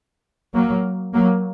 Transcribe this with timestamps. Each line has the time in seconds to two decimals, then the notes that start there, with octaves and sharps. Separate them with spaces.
0.54 F#3 A#3
1.14 F#3 A#3